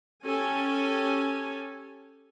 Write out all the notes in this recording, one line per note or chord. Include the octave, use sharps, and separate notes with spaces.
C#4 G4 A4 G#5